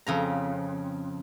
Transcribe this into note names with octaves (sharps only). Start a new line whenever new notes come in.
F2 C#3 A#5